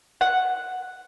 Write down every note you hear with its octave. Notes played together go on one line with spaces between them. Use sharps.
F#5